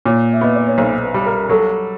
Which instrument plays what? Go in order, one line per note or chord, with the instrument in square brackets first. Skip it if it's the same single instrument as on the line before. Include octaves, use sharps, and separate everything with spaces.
[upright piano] A#2 [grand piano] C#5
[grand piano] E5
[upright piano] B3 [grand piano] D#5
[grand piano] D5
C#5
[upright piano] B1 [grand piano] C5
[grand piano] B4
[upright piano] G3
[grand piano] A#4
[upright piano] F#3 [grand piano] A4